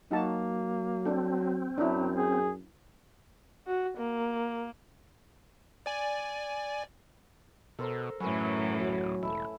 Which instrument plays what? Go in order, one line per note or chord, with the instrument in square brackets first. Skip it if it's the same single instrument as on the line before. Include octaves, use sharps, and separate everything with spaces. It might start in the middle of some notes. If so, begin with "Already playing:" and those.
[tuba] F#3 [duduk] A#3 [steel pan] D#4 F#4 A5
[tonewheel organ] C4 [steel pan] D4 A4
[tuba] F#2 [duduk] F#3 [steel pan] D4 E4
[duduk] G#4
[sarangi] F#4
A#3
[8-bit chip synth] D5 G#5
[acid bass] B2 [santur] A4 A#4 C5
[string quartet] F#2 A2 E3 [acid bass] F#3 [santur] C#4 B4
[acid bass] D1 [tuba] F#3
[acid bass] E1 [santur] A3 E4